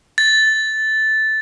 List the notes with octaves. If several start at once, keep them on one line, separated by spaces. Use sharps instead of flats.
A6